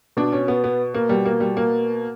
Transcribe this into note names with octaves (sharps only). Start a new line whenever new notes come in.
B2 D4
C#4
B3
B3
A#3
B2 G3
A#3
G3
A#3